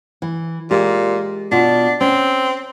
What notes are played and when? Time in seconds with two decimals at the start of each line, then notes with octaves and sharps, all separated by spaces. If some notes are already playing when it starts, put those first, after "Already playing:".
0.22 E3
0.71 A#2 G#3 G4
1.52 B2 D4 F4
2.01 C4 C#4